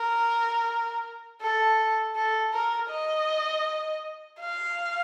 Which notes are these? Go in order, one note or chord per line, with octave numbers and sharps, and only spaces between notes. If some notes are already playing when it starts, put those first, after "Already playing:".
Already playing: A#4
A4
A4
A#4
D#5
F5